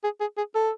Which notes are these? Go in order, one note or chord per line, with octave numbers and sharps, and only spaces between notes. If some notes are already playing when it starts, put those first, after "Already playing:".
G#4
G#4
G#4
A4